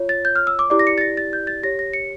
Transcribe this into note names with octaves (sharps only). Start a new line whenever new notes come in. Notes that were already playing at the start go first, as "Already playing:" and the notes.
Already playing: F4 C#5
A6
G6
F6
E6
D6
E4 G4 D5 D6
A#6
C#7
A6
A#6
A6
G6
A6
G4 C#5 A#6
A#6
C#7